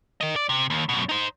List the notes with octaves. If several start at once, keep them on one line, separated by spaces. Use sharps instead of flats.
A#4 D#5
D5
C3
D#2
F#2 B2
D#4 C5